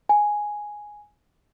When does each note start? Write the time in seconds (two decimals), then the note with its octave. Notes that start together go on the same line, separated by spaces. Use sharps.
0.09 G#5